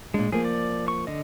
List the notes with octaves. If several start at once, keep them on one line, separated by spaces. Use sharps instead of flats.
A#2 G#3 D4
F3 A#3 G#4
D5
C#6
D3 D#5